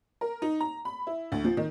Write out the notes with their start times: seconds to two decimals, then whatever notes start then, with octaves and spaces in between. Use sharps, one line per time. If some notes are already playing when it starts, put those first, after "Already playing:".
0.21 A#4
0.42 D#4
0.61 A#5
0.85 B5
1.07 E4
1.32 D2
1.44 F3
1.57 D#3